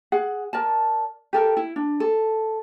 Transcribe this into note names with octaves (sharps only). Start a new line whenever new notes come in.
G#4 F#5
A#4 D5 A5
G4 A4 A#4
E4
D4
A4